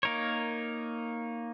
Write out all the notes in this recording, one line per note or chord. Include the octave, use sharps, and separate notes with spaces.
A#3 D#4 A#4 C#5